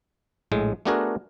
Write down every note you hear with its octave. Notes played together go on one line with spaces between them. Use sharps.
A#1 A2 G#3
A3 B3 D4 F#4 G#4 A#4